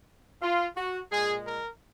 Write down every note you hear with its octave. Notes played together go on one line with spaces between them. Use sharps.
F4
F#4
A#2 G#3 G#4
A#4